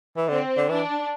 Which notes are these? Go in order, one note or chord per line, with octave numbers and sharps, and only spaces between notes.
E3
D3 C4
D3
E3 D4